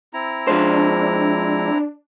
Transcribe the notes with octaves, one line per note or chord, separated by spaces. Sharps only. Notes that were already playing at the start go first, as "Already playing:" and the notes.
C4 E4 A#5
F3 G#3 D4 C5